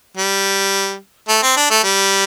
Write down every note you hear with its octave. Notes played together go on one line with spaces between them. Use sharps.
G3
A3
C4
D4
A3
G3